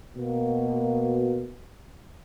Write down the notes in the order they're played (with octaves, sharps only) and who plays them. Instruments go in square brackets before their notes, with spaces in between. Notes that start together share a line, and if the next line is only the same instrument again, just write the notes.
[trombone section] B2 A#3